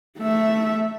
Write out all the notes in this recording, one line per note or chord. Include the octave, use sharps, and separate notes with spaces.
A3 E5